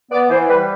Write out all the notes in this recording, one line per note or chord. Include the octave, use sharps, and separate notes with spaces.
B3 D5
E3 C5
G3 B4